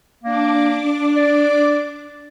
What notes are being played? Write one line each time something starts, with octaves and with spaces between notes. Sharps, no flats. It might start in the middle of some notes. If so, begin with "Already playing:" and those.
A#3 D4 D6
D5